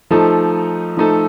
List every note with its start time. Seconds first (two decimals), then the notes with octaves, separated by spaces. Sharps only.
0.11 F3 A3 D#4 A4
0.97 F3 A3 D#4 A4